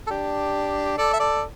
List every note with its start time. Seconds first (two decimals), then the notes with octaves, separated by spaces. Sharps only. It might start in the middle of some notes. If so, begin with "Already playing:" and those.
0.07 A4
0.11 D4 G4
0.98 A4 D5
1.13 E5
1.20 A4 D5